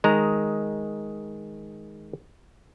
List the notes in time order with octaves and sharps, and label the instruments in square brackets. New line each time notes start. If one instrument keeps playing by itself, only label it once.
[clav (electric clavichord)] D#3 G#3 D#5 A#5